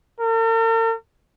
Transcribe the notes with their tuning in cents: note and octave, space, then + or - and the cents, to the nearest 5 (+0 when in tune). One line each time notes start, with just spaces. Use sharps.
A#4 -45